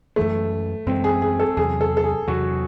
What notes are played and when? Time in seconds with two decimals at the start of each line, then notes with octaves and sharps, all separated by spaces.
0.16 F#2 E3 G#3 A3
0.86 F#2 E3 G#3 C4
1.04 G#4
1.22 G#4
1.40 A4
1.57 E2 C3 F#3 G#4
1.81 A4
1.97 A4
2.04 G#4
2.27 E2 C3 F#3 F#4